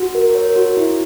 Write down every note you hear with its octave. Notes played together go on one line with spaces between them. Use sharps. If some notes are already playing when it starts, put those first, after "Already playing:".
Already playing: F#4
A#4
C#5
F#4
E4